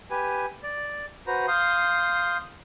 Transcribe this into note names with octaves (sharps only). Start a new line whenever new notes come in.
G4 B4 G#5
D5
F#4 B4 C5 A#5
F5 C6 D#6 G6